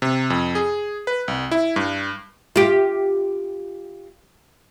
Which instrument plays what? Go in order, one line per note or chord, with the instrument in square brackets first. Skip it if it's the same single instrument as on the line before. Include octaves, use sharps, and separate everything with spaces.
[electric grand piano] C3
F2
G#4
B4
C2
E4
G2
[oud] F4 G4